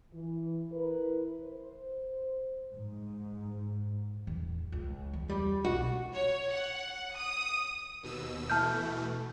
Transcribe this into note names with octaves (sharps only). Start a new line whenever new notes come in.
E3
E4 A#4 B4
C5
G#2
D1 E2
C#2
E2
G3
B1 F#4
C#5
F#5
D#6
D#2 B2 E6
B2 E3 A3 A5 F6 G6